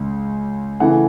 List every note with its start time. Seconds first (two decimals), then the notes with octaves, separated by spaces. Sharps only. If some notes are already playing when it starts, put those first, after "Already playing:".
Already playing: C#2 C#3
0.80 C#3 E3 A3 F#5